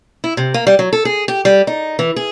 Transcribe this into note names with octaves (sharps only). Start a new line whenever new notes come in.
E4
C3
A#3
G3
F#3
A4
G#4
G4
G3
D#4
E3
G#4